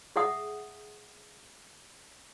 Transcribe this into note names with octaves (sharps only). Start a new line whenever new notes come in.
G#4 E5 F#5 D#6